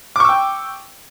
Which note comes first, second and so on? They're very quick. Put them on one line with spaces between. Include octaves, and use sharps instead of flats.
D6 C#6 E6 G5